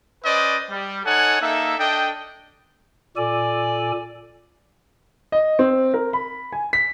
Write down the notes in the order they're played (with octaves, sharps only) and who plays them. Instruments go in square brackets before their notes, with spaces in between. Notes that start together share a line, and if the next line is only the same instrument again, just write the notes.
[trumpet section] C#4 B4 C5 D5 D#5
G3
D#4 A4 C#5 F#5 G#5
A#3 D#4 A4 E5
D4 A4 D#5 G5
[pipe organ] A#2 A4 G#5 [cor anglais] D5
[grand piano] D#5
C4
A#4
B5
G#5
B6